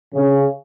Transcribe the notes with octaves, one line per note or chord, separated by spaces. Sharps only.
C#3